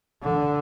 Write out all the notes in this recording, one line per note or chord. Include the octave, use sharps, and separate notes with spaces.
D3